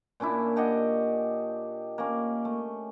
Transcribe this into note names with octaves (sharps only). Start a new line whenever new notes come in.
A#2 C#4 D4 E4
D4 G4 D#5 F#5
A#3 C#4
A3